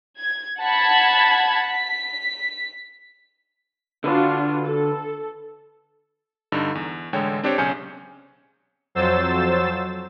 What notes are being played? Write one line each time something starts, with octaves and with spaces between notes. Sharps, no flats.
G#6
F#5 A5 B5 G#6
B6
D3 D4 F4 F#4 B4
A4
G2 D3 D#4
E2
A1 D3 G#3 C#5 G5
C4 D4 G4 C5 C#5
B1 C#3 C#4 G#5 G6 C#7
F2 F#3 C5 E6 A6 E7